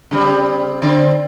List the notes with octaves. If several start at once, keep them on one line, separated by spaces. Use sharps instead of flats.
C#3 G3 C4
D3 C4 D5